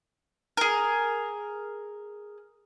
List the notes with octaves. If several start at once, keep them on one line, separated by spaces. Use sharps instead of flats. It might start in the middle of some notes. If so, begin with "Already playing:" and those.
G#4 A#4